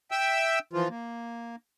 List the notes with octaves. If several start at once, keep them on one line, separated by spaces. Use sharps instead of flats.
E5 G5 E6
E3 F3 F4
A#3